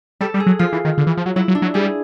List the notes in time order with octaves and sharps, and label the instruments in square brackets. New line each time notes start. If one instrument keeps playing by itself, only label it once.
[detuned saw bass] G3 [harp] A4
[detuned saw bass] G3
[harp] G#4
[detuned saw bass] F#3
[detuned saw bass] F3 [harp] F4
[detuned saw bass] E3
D#3
D3
E3
F3
F#3
[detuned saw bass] F#3 [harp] E4
[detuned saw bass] F#3
[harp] D4
[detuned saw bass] F#3
[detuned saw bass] G3 [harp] G#4